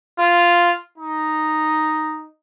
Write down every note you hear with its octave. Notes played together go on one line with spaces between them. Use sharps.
F4
D#4